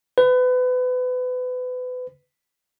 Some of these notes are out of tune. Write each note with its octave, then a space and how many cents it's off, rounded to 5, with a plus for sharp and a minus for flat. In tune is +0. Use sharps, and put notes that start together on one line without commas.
B4 +30